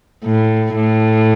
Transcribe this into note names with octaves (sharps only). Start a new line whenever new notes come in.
A2
A2